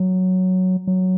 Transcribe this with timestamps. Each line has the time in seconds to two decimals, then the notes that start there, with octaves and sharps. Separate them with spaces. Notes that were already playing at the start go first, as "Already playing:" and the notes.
Already playing: F#3
0.87 F#3